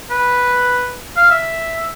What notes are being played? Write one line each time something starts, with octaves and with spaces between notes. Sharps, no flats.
B4
F5
E5